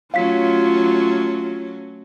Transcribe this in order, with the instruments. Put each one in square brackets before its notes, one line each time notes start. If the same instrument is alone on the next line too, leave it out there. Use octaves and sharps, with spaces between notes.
[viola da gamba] F#3 A3 C#4 [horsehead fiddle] F4 [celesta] F5 B6